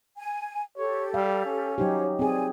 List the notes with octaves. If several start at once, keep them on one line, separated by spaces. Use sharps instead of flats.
G#5
G4 A4 C#5
G3 F5
C#4
F#3 D#4 G4 C5 C#5
C4 G#4 D5 G#5